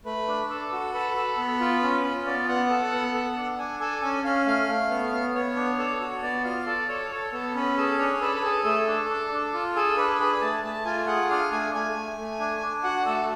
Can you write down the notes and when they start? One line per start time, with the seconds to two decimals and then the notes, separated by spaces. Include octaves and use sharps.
0.05 A3 B4
0.28 D4
0.50 A4
0.72 F#4
0.94 A4 B4
1.16 A4
1.37 B3
1.60 F4
1.82 C#4
2.04 F4
2.26 B3 D5
2.48 B3 F#5
2.70 A4
2.92 B3
3.14 A4
3.36 D4
3.59 D4 G#5
3.80 A4 G#5
4.02 C#4 G#5
4.24 C#4 F5
4.46 A3 F5
4.69 A3
4.90 B3
5.12 B3
5.35 B3 C#5
5.56 D4
5.78 A4
6.00 F#4
6.23 B3 D5
6.44 F4 F5
6.66 A4 D5
6.88 A4 C#5
7.10 A4 C#5
7.32 B3 A4
7.54 C#4 B4
7.77 G#4 A4
7.99 D4 C#5
8.21 A4 B4
8.35 B4
8.43 G#4 A4
8.64 A3 A4
8.87 D4
9.09 D4
9.32 D4
9.54 F4
9.75 G#4 A4
9.97 D4 B4
10.20 G#4 B4
10.41 A3 A5
10.64 A3 A5
10.85 F4 G#5
11.07 G#4 F#5
11.30 D4 F5
11.51 A3 G#5
11.73 A3 G#5
11.95 A3
12.18 A3
12.40 D4
12.61 D4
12.83 F#4 F#5
13.05 A3 A4